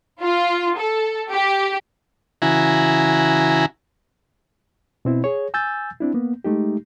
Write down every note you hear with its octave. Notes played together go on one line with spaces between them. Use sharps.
F4
A4
G4
C#3 E3 E4 F#4 G#5 A#5
B2 C4 E4
G#4 C#5
G#5 E6 G6 A6
C4 D4 E4
A#3 B3
G#3 A3 D#4 G4